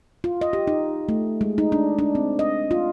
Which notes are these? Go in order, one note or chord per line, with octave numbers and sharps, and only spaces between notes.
F4
D#5
G4
D#4
A3
G#3
D#4
D4
D4
C4
D#5
F4